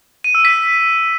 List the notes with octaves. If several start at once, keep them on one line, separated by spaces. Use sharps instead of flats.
D#7
E6
B6